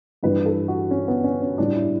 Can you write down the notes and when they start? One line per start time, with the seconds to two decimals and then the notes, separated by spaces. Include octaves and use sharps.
0.23 G2 E3 G3 B4
0.46 A4
0.68 F#4
0.91 C#4
1.08 B3
1.24 C#4
1.42 C#4
1.58 A2 G3 D4
1.75 E4